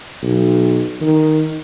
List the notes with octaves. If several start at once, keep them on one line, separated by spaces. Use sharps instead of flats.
B1
D#3